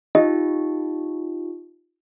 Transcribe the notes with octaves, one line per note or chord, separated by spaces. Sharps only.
D#4 F4 G4 D#5